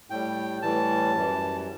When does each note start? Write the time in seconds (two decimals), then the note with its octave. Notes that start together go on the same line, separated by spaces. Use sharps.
0.10 A2 G3 G5
0.62 A2 E3 G3 A5
1.15 F#2 E3 G3